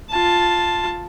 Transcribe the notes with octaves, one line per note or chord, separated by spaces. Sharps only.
F4 A5